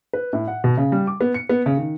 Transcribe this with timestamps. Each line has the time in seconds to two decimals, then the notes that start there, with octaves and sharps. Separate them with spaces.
0.13 B4
0.33 A2
0.48 F#5
0.64 B2
0.77 C#3
0.92 G3
1.07 D6
1.21 B3
1.34 C#7
1.49 B3
1.66 C#3
1.77 D#3